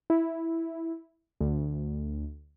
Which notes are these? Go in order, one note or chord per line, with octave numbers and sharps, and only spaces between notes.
E4
D2